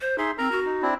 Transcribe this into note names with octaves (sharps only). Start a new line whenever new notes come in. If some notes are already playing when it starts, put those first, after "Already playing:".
C5
D#4 G#4 E5 C6
C4 A#4 A#5
F#4
D#4
C4 D4 E4